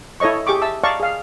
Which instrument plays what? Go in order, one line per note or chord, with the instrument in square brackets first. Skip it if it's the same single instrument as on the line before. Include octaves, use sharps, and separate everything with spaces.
[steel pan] E4 A4 C#5 D#5 C#6
G4 G#4 G5 C#6 D6
E5 A5 E6
D5 D#5 F5 A5 A#5 C#6
G#4 F5